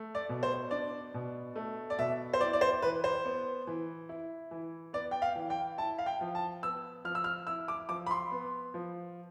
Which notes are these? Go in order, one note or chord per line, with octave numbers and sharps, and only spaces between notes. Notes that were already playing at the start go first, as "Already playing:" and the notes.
Already playing: A3
D5
B2
C5
D4 D5
B2
A3
D5
B2 E5
C5
E4 D5
D5
C5
E3 B4
C5
B3
E3
E4
E3
B3 D5
G5
F5
E3
G5
E4 A5
F5
G5
F3
A5
B3 E6
F3 F6
E6
F6
E4 E6
D6
F3 D6
B5
C6
B3
F3